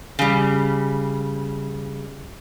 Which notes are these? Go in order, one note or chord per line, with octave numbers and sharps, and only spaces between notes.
C#3 G3